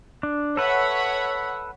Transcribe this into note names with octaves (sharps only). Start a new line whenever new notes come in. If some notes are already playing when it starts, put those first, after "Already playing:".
D4
A4 B4 C#5 E5 F#5 B5